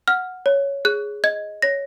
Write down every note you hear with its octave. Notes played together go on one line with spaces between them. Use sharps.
F#5 F6
C#5
G#4 F#6
D#5 G#6
C#5 A#6